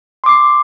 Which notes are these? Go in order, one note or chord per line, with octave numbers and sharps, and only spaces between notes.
C6 D6 C7